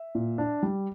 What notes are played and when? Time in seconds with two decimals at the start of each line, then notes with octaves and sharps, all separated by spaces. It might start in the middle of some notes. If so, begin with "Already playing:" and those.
Already playing: E5
0.15 A#2
0.38 D4
0.63 G3